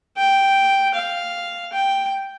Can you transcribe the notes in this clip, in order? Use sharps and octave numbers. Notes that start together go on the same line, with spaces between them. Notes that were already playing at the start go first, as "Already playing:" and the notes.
G5
F5
G5